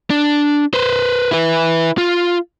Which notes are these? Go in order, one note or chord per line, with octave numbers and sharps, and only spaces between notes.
D4
B4 C5
E4 B4
F4